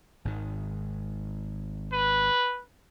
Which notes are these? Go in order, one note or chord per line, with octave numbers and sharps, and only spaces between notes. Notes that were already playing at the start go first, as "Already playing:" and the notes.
G#1 G#2 D#3
B4